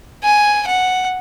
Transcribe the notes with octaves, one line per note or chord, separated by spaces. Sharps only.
G#5
F#5